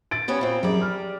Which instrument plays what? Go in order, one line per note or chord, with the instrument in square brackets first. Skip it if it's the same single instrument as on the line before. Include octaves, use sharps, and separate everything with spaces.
[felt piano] A6 D7
[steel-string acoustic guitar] G3 B3 C#4
A#2 C4
[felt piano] F#2 G#4 [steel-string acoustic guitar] G3 D5
[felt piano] F6